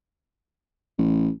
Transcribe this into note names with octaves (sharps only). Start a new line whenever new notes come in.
A1